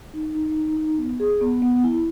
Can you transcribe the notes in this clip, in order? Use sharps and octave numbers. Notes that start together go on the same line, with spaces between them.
D#4
D#4
D#4
D#4
B3
G#4
B3
B3
E4